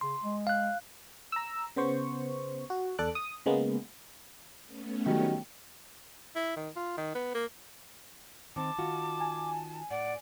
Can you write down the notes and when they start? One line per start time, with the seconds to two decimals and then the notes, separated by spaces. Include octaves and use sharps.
0.01 C#3 C6
0.22 G#3
0.47 F5 F#6
1.32 A#5 E6
1.76 C#3 B3 C5 C#6
2.70 F#4
2.99 E2 A4 D5 D6 F#6
3.15 D#6
3.46 C#3 G#3 A#3 B3
4.66 A3 B3 C#4
5.06 D#3 F#3 G3
6.36 E4
6.56 D#3
6.76 F4
6.98 D#3
7.15 B3
7.34 A#3
8.56 D#3 C4 A5 D6
8.79 D#3 F4 F#4
9.20 G#5
9.91 A2 D5 F#5